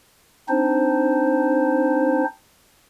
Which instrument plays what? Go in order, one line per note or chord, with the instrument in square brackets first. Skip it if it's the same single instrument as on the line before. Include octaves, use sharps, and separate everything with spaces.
[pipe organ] C4 D4 D#4 C5